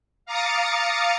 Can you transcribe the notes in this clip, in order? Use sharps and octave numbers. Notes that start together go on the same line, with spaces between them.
F5 A#5 D6 D#6 A6 C#7